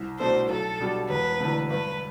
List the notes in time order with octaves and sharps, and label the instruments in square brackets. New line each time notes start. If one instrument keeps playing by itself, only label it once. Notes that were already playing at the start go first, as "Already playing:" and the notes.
Already playing: [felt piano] C2
[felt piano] B2 A3 D4 A4 [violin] C5
[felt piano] B1 [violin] A4
[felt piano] B2 G3 D4 G4
[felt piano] E1 [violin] B4
[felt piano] E2 D3 A3
[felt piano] G2 [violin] B4